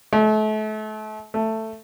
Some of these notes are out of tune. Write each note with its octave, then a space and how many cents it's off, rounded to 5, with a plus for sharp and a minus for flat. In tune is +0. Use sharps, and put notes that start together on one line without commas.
A3 -35
A3 +10